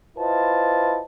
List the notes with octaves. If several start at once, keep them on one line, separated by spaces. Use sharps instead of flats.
E4 F4 B4 C5 D#5 A5